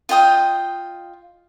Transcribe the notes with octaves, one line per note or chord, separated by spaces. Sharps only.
F4 D#5 G5 D#6